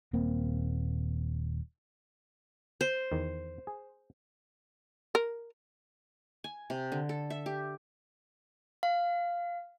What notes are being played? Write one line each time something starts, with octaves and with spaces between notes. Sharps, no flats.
D#1 A#3 C4
C5
E2 D#3
G#4
A#4
G#5
C3
D3
A4
E5
G4
F5